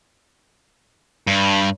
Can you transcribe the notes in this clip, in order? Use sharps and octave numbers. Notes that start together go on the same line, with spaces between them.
G2